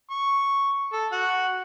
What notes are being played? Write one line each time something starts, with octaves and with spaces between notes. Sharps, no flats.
C#6
A4
F#4 F#5